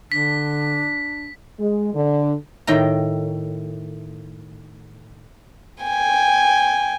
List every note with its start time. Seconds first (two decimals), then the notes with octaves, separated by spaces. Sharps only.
0.12 D3 D4 B6
1.59 G#3
1.94 D3
2.67 A2 D#3 G5 A#5
5.83 G5 G#5